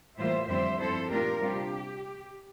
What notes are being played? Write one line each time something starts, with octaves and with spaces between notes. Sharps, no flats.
A2 E3 G3 A#3 F4 C5 E5
F2 D3 G3 C4 C5 E5
G2 F3 C4 E4 A4 C5
A#2 A3 D4 F4 G4 A#4
C3 G3 D4 F4 G4